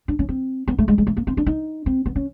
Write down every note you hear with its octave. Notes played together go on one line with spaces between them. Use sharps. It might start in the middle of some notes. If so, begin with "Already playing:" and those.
D4
C#4
C4
B3
A3
G#3
G#3
A3
A#3
C4
D4
D#4
C4
B3
C#4